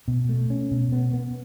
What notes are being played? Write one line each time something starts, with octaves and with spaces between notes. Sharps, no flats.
B2
A3
C#4
B2
B3
B3